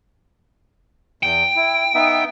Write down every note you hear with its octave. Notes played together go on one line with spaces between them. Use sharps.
E2 G5
E4
B3 D#4 E5